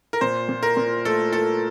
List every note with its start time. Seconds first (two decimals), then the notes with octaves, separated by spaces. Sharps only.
0.13 A#4
0.21 A#2 C5
0.49 A#2
0.63 A#4
0.77 A#2
1.05 A3 A4
1.33 A3 A4